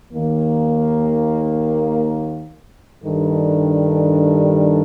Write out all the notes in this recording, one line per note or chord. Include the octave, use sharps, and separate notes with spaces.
D#2 D#3 A#3
G2 D#3 G3 D4 A4